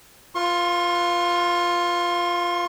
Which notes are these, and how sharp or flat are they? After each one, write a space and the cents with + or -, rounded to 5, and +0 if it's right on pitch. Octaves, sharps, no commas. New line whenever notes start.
F4 +0 B4 +0 C6 +45